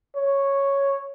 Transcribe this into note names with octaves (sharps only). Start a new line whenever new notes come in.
C#5